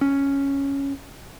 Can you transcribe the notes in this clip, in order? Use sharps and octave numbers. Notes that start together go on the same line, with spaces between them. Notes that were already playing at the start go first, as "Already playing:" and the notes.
C#4